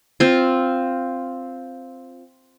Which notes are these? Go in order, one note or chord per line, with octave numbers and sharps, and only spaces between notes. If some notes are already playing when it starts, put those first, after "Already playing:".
C4 F4